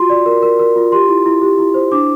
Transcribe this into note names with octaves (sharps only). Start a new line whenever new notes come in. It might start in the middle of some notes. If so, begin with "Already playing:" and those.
Already playing: F4 F#4 C6
D5
A#4
A#4
A#4
F4
G4 C6
E4
E4
G4
E4
C5
D4 D6